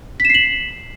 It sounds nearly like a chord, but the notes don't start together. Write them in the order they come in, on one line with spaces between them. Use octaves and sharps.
B6 E7 C7 F#7